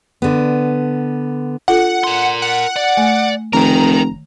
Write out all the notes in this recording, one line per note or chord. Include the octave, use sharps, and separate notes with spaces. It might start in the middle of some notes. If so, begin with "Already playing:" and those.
D3 B3
D4 F4 A4 F#5
A#4 C6
F#5
D5
A3 G#5
F1 D#3 A#4 G5 A#5